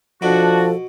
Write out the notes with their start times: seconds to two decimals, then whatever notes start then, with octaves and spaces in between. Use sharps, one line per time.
0.22 B2 F3 D4 F#4 A4